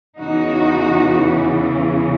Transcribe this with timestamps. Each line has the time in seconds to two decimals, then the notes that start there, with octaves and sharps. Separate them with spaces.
0.18 E2 C#3 E3 D#4 F#4